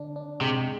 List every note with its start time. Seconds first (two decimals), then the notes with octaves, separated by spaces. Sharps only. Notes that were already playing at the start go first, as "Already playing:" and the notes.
Already playing: D3 D4
0.16 D4
0.41 C3 G#3